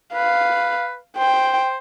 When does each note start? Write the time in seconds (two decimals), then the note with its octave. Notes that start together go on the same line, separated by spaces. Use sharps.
0.14 B4 F5
1.18 C5 G5